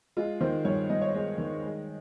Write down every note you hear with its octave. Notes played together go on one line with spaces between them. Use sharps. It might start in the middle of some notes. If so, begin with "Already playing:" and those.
G#3 F4
D#3 C5
G2 C#5
G2 D#5
C#5
G#3 D#5
D#3
G#3